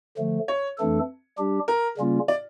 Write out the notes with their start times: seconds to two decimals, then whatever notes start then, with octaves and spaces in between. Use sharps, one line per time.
0.18 D3 F3 A3
0.48 C#5
0.78 F2 E3 A3 D4 A4
1.38 G3 D4 G4
1.68 A#4
1.98 C#3 G3 A#3 C#4 F4
2.28 D5